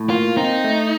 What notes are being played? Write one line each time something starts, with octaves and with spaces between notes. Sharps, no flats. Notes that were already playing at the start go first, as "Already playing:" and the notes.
Already playing: A2
A#3 F4
C4 D#4
A3